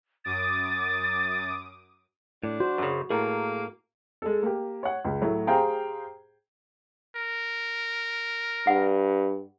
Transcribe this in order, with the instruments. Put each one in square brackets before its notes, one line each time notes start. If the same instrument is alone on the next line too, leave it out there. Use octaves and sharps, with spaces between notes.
[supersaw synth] F#2 D6 D#6 [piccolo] A6
[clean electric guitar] A2 [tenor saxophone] D4
[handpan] F#4 [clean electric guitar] C5
[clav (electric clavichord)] F#2 C#3
[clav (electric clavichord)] A2 [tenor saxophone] A#3 [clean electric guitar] G#4 A#4 A#5
[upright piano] G#3 A4
A#3 G4
C#5 F#5
C#2
A2 F#3 A3
G4 G#4 C5 F5 G5 A#5
[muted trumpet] A#4
[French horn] G2 [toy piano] F#5